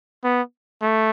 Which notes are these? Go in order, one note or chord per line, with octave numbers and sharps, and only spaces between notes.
B3
A3